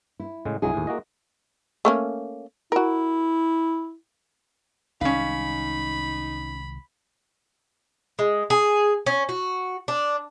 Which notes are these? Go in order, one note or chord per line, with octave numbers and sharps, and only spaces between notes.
E4
A2 C#3 G#3
C2 F#3 G#3 E4 G#4
D#2 A2
A#3 F#4 D#5
A3 A#3 C#4
E4 F#4 A#4
C2 D#3 G#3 C#4 D#4 F5 B5
G#3
G#4
C#4
F#4
D4